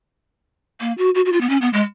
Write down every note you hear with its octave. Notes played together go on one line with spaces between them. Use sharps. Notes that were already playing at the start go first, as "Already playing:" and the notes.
A#3
F#4
F#4
F#4
F4
B3
C#4
B3
G#3